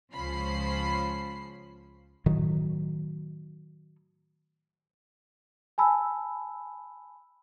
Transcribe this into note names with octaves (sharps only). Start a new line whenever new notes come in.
C#2 F3 C#4 C5 B5 C7
A2 D#3 F#3
G#5 A5 B5 E6